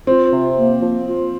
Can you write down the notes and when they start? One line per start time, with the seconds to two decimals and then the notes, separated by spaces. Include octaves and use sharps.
0.07 C4 F4
0.32 C3
0.56 A#3
0.81 F3
1.06 F4